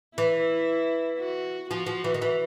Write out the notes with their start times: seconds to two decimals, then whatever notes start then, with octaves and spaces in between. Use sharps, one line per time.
0.17 E3 E4
1.19 F#4
1.70 F3 F#4
1.86 F3
2.04 E3
2.14 D#3
2.22 E3